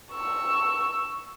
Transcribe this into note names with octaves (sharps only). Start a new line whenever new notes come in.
C#6 E6